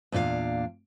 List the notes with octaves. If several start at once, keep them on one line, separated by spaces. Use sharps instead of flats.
E2 A#2 D4 F#4 F5